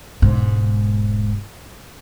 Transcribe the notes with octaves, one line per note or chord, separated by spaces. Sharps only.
E1 G#2